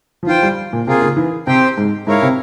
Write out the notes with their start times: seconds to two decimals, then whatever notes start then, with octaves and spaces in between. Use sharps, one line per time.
0.23 F3
0.27 E3 F4 C5 G5
0.43 G3
0.73 A#2
0.87 C3 A#3 F4 G#4
1.02 C#3
1.16 E3
1.47 C3 C4 G4 C5 G5
1.78 G#2
2.07 G#2 E4 A#4 C#5 F5
2.22 C3